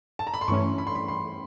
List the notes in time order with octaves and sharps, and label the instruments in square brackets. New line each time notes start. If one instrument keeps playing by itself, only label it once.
[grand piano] A5
A#5
B5
C6
[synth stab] G2 E3 A3 C#4 [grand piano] C#6
[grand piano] B5
C6
B5
C6